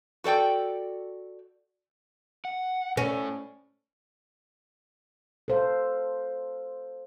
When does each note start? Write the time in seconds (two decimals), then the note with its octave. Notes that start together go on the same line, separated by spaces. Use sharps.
0.24 F#4 A4 D5 G5
2.45 F#5
2.97 A2 C#4 A4
5.48 A4 C5 F5